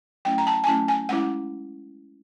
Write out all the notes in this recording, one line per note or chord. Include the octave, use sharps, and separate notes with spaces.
F#3 A3 C#4 E4 G5
A#5
A5
G#5
F#3 A3 C#4 E4 A5
G#5
G#3 C#4 E4 F#5